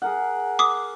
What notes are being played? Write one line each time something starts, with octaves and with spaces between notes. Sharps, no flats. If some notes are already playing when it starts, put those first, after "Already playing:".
G#4 A#4 F#5
D6 D#6